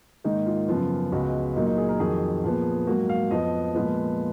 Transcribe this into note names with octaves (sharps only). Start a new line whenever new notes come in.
G#2 D#3 A#3 D#4
F4
F#2 C#3 F3 B3 F4
C#2 C#3 G#3 B3 F#4
A#2 F#3 A#3 D#4
D#4
G#4
A#4
F2 D#3 F#3 G#4
A#2 F3 B3
G#2 F#3 A#3 F#4
F5
F2 F3 B3 D#5
A#2 F3 G#3 B3 F4